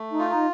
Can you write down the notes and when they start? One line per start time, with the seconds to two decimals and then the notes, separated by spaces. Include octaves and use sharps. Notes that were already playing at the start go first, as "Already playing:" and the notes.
Already playing: A3
0.10 D#4
0.19 F4
0.29 D#4